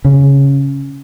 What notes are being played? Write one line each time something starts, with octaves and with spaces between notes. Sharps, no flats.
C#3